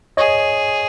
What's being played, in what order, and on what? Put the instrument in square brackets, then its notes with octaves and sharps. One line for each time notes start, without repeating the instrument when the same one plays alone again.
[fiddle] G#4 [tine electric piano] C#5 D#5